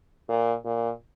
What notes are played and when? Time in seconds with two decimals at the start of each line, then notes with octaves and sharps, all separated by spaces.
0.29 A#2
0.65 A#2